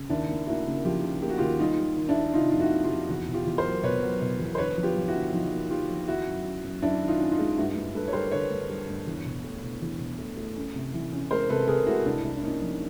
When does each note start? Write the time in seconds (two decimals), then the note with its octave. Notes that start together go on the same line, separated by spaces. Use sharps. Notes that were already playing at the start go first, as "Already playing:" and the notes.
Already playing: C#3
0.09 D#2 D4 E4
0.29 A#3
0.47 A#3 E4 F#4
0.66 C#3
0.84 F3 F4 G4
1.03 C#3
1.22 A#3 G4
1.29 F#4
1.38 D#2 F4 G4
1.60 G3 D#4 F4
1.78 G3
1.96 D#3
2.09 D4 E4
2.16 D#3
2.34 C3 D#4 F4
2.51 F2 F4
2.60 E4 F#4
2.71 C3
2.84 F4 G4
2.91 F2
3.09 E2 E4 F#4
3.28 B2
3.34 F4 G4
3.46 E2
3.58 A#4 C5
3.65 F#3
3.83 B2 B4 C#5
4.02 F#3
4.21 B2
4.39 E2
4.55 C5
4.58 D3 B4 C#5
4.77 F3
4.83 F4 G4
4.96 F3
5.08 E4 F#4
5.15 D3
5.33 F3 D#4 F4
5.52 A#3
5.70 D#4 F4 G4
5.89 F3
6.07 D#3 E4 F#4
6.27 F#2
6.45 C#4
6.64 F#2
6.82 F#2 D4 E4
7.01 D#3
7.07 D#4 F4
7.20 C#4
7.32 D#4 F4
7.39 G#3
7.57 G2 E4 F#4
7.75 G2
7.94 G2 A4 B4
8.08 C#5
8.13 G3 A#4 C5
8.32 D3 B4 C#5
8.50 G2
8.69 G3
8.88 G2
9.07 E2
9.25 B2
9.44 A3
9.63 B2
9.81 E2
10.00 B2
10.18 A3
10.37 A3
10.56 C#4
10.75 C3
10.94 E3
11.12 C#4
11.31 G#3 A#4 C5
11.49 C3 A4 B4
11.68 C3 G#4 A#4
11.87 G#3 E4 F#4
12.06 C2 D4 E4
12.24 C2
12.37 D4
12.43 A#3 C#4 D#4
12.61 F3